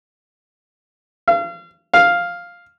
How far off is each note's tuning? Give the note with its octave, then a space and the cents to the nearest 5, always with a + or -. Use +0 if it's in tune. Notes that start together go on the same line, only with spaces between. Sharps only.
F5 -35
F5 +0